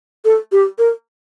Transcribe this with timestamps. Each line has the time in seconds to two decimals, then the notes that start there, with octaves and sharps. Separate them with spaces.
0.25 A4
0.52 G4
0.79 A#4